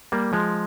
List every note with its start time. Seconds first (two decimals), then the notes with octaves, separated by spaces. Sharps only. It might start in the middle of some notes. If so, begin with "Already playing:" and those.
0.12 G3 A#3
0.33 F3 G#3